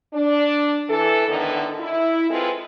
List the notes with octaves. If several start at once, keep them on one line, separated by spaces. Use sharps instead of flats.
D4
E3 A4
A2 D3 D#3 B3 D#4
E4
G#3 C4 F4 A4 B4